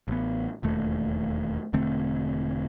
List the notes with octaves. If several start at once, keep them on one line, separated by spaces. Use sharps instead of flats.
A1 B3
E1 D#2 A3
E1 D3 A3 C4